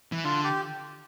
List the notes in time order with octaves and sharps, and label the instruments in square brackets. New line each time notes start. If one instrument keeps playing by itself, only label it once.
[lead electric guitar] E3
[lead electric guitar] D3 [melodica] F4
[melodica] G4